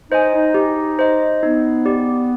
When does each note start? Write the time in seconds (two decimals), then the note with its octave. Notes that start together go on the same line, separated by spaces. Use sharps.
0.11 D#4 C5 D#5 G#5
0.34 D#4
0.54 G4
0.99 C5 D#5
1.43 B3 D#4
1.86 G4 D5